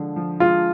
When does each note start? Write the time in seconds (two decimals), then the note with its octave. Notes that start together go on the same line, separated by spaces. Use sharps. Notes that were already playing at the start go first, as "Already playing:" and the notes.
Already playing: D3 F3 G#3
0.16 F3
0.40 G#3 F4